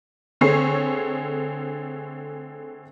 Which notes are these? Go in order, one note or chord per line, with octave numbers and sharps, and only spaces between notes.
D3 A3 C4 G#4 C#5 C7